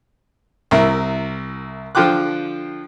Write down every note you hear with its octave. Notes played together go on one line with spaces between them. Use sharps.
C2 E4 A#4
D3 F3 F4 G5 D6 F#6